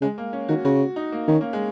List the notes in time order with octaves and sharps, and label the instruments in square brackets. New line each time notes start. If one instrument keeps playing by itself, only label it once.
[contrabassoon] C#3 [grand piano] G#3
[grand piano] A#3
C#4
[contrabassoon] D#3 [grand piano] F#4
[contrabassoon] C#3 [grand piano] F#4
[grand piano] D#4
A#3
[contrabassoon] D#3 [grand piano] C#4
[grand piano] A#3
G#3